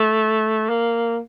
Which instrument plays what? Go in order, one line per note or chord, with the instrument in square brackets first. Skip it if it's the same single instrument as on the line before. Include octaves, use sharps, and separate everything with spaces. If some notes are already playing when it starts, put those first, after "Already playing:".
Already playing: [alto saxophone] A3
A#3